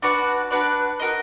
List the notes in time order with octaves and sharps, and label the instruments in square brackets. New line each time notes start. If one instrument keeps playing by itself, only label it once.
[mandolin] D4 F#4 B4 D5
D4 F#4 B4 D5
F#4 A#4 D#5